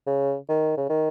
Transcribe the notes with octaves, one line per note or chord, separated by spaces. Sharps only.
C#3
D#3
C#3
D#3